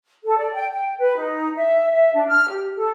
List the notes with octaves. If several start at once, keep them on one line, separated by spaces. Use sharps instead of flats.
A4
D5
G5
G5
B4
D#4
E5
E5
D4
F6
G4
A4